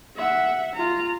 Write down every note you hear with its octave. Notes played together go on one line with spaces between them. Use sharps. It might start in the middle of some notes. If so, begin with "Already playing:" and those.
E5 F#5
F4 A#5